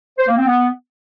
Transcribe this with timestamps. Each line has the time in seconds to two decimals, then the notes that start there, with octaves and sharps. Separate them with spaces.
0.18 C5
0.27 A#3
0.37 C4
0.47 B3